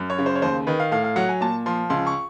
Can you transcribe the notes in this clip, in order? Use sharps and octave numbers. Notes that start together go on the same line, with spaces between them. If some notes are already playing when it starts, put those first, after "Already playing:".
Already playing: F#2
C#5
C#3
C5
C#5
D#2 C5
D#3 B4
F5
A2 F5
F5
F#3 F#5
G#5
A#2 A5
F3 C6
C#2 C6
C#6